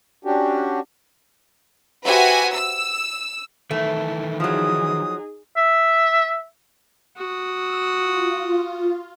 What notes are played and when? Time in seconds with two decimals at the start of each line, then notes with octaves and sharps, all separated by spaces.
0.25 C#4 D4 F#4 G4
2.06 F#4 G4 B4 C5 E5 G#5
2.54 E6
3.71 D#3 E3 A3 E4
4.40 F3 F#3 D#4 G#4 D#6
5.57 E5
7.17 F#4 D#6
7.52 E6
7.96 F4